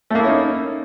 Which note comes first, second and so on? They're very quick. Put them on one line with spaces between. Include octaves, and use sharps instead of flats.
A3 A#3 E4 C#4 D#4